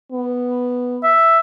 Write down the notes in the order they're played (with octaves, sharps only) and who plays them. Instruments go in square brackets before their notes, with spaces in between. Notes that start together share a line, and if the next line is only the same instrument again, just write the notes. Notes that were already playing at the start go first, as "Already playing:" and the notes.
[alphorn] B3
[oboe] E5